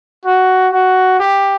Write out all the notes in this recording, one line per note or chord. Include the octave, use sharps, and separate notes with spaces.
F#4
F#4
G4